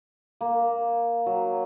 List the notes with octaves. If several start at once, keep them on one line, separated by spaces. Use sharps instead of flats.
A#3
F#3